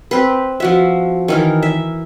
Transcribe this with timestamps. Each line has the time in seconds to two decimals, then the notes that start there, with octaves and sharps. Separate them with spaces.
0.11 C4 B4
0.60 F3 F#4 E5
1.28 D#3 E3 A#4
1.63 E5